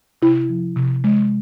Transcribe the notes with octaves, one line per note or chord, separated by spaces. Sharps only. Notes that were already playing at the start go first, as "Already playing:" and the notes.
C3 E4
F3
C3
G#3